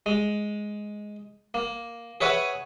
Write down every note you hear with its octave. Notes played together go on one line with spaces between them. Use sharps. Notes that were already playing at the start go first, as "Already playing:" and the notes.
G#3
A#3
G#4 B4 C#5 E5 F#5 G#5